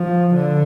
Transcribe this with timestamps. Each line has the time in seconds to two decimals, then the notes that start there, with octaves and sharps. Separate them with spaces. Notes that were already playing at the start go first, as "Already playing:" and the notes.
Already playing: F3
0.34 D3